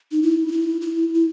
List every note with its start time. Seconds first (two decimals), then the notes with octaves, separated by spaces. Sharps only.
0.12 D#4
0.23 E4
0.48 D#4
0.52 E4
0.81 E4
1.14 E4